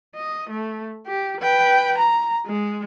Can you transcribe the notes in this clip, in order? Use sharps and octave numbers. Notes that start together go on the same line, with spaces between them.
D#5
A3
G4
B4 G5
A#5
G#3